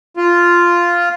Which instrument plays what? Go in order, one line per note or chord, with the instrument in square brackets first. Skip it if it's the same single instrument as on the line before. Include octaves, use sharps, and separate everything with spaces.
[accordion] F4